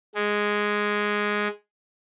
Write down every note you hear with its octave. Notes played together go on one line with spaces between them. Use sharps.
G#3